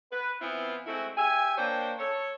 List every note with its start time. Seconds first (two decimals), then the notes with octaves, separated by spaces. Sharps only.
0.11 B4
0.41 E3 B3 C4 E4 F4
0.86 G#3 A3 C4 E4 F#4
1.17 G4 E5 G#5
1.56 A#3 D4 C5 C#5 G5
1.99 A4 C#5